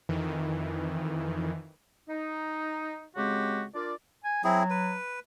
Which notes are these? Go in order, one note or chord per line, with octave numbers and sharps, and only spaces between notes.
F2 D#3 E3
D#4
C#3 G#3 C4 F#4 G4
D4 F4 A#4 D5
G#5
F#3 C4 E4 G#4
B4